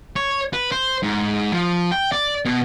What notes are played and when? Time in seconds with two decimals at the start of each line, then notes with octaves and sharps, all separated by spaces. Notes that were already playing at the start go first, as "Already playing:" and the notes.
0.16 C#5
0.53 B4
0.72 C5
1.03 G#2
1.52 F3
1.91 G5
2.12 D5
2.45 B2